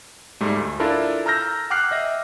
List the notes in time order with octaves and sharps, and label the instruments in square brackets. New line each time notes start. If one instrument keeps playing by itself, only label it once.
[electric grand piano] G#2 G3 A3
D2
D4 E4 F4 A4 A#4
A5 A#5 E6 F6 G6 A#6
F#5 G5 D6 F6 F#6 C7
D#5 E5 A#6